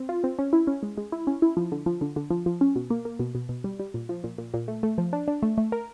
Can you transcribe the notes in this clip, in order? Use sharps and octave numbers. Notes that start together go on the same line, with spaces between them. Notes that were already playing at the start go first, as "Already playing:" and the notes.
Already playing: C4
F4
C4
C#4
E4
C#4
G#3
G#3
E4
C#4
E4
F3
D3
F3
D3
D3
F3
F3
C#4
B2
A#3
A#3
B2
B2
B2
G3
G3
A#2
F3
A#2
A#2
A#2
A3
A3
F3
D4
D4
A3
A3
A#4